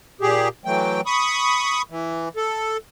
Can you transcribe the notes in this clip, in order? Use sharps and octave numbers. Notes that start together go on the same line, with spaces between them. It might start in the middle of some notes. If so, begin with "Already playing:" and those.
A#2 G4 G#4
E3 F#3 A3 G5
B5 C#6 D#6
E3
A4